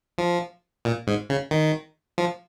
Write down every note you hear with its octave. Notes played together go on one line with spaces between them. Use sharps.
F3
A#2
G#2
C#3
D#3
F3